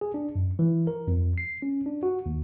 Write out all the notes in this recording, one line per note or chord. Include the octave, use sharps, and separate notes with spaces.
G#4
D4
F#2
E3
A#4
F2
C7
C#4
D4
F#4
D#2